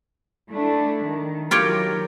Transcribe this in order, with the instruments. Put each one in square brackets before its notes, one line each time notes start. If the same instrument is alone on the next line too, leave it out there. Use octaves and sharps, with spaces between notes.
[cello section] A3 D4 E4
D#3
[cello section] D#3 F#3 A#4 [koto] F4 G4 C#5